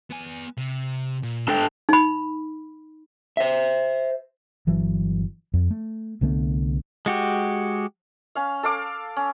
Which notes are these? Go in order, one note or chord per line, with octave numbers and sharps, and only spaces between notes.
B3 G#5
C3
A#2
G#2 D4 A4 G5
D#4 B5
C5 E5
G1 E3 F#3
F2
A3
C2 D3 A3 B3
G#3 F#4 G4
C#4 F5
A4 F5 D6
C#4